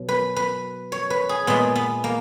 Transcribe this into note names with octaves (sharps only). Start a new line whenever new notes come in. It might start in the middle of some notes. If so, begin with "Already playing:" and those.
Already playing: B2 F#3
B4
B4
C#5
B4
G#4
A#2 G#3 B3
B3
A#3